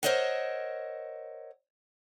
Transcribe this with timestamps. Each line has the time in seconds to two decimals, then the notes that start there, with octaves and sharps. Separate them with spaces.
0.03 A#4 C5 C#5 D#5 E5 F#5